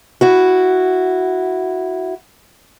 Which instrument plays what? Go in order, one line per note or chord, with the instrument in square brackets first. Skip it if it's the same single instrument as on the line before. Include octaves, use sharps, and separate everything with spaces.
[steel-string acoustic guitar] E4 F#4